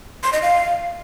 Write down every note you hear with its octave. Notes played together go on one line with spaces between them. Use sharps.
C6
D#5
F5